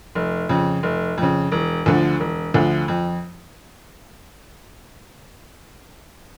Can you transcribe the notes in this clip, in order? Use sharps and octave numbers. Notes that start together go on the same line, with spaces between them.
F1
F2 C#3
F1
F2 C#3
E1
D2 D3 F3
E1
D2 D3 F3
F2